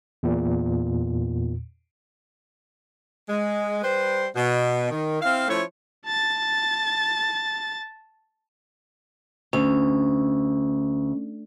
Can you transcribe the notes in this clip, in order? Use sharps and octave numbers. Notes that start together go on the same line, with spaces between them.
E2 A#2
G#3
G3 B4 C5
B2
D#3
C4 E4 F5
F3 A3 C#4 E4 C#5
A5 A6
D2 C#4